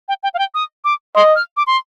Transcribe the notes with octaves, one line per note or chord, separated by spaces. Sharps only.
G5
G5
F5
G5
D#6
D6
D#5 C6
F6
D6
C6